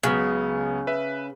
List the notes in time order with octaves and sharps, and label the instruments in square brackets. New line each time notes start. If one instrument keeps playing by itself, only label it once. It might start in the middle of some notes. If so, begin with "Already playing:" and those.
[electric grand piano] C#2 F#3 B3 [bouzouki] C#3
[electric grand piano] B4 E5